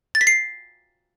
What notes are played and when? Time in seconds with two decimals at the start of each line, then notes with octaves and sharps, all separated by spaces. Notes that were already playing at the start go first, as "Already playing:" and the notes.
0.15 A6
0.21 B6
0.27 C7